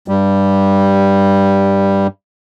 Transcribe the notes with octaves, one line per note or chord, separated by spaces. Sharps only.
G2 G3